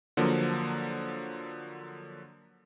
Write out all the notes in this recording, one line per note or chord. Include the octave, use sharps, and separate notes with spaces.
D3 F3 F#3 A#3